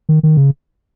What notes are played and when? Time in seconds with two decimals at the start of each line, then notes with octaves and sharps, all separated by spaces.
0.09 D#3
0.23 D#3
0.37 C#3